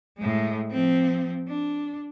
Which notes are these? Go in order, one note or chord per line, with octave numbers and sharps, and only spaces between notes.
A2 G#3
F3 C4
D4